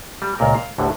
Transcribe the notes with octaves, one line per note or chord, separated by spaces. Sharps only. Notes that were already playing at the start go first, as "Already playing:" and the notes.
G3
C#2 A#2 A#4
F5
G1 D2 A2 D3